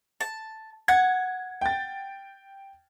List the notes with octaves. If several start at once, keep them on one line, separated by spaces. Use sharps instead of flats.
A5
F#5 G#6
G5 A6